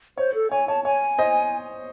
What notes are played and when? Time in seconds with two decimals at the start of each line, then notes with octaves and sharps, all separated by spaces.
0.18 C5 C#5
0.34 A4
0.51 C#5 G#5
0.68 C#5 A5
0.85 C#5 G#5
1.19 C5 D#5